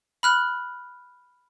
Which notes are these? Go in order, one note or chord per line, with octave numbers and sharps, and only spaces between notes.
B5 F6 F#6